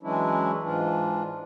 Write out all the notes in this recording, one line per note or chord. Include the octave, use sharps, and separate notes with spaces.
E3 F#3 G#3 C#4 D4 E4
G#2 E3 D4 F4